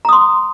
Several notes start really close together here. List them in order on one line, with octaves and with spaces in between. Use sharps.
A#5 D#6 C6